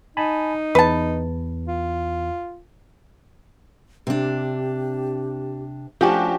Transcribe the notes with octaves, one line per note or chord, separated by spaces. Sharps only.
D#4 G#5 A5 B5
E2 B4 A5
F4
C3 D4 G4
F3 A3 C#4 D4 F#4 G4